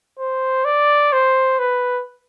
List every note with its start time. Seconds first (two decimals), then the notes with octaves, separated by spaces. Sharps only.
0.19 C5
0.65 D5
1.13 C5
1.59 B4